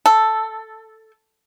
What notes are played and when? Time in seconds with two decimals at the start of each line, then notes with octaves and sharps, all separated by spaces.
0.06 A4